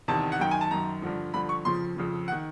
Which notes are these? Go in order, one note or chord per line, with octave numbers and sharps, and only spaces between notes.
E2 C3 D#3 A5
F#5
F#2 D#3 G5
G#5
A5
F#2 D#3 A#5
G2 D3 F3
G2 D3 F3 B5
C#6
F2 C#3 F3 C6
F2 C#3 F3
F#5
D#3